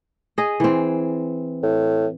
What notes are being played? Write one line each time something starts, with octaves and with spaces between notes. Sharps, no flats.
G#4 D#5
E3 C4
A2